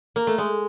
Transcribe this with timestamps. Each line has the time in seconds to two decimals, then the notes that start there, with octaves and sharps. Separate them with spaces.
0.16 A#3
0.27 A3
0.38 G#3